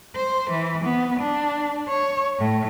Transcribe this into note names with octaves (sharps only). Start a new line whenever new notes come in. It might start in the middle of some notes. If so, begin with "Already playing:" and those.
C5
E3
B3
D4
C#5
A2